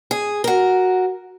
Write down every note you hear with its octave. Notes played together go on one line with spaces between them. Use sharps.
G#4
F#4 A#4